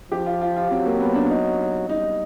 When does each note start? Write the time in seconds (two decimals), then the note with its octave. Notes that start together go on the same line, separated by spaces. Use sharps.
0.11 F3 G4
0.26 F4
0.41 F4
0.56 F4
0.71 F#3 C4
0.86 A#3
1.00 B3
1.15 D4
1.29 D#4
1.89 G3 D#4